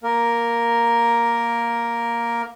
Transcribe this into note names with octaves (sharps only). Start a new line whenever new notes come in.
A#3 A#4